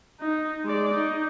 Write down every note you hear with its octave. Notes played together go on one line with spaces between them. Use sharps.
D#4
G#3 D5
D#4